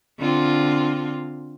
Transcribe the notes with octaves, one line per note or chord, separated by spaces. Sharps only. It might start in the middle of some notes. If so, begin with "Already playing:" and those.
D3 C4 F4